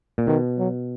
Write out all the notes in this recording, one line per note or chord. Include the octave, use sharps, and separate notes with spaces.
A#2
B2 D#3
F#3